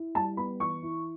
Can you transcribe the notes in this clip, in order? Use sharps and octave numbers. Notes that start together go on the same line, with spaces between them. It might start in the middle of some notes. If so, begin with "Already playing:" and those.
Already playing: E4
G3 A5
B3 B5
E3 C#6
E4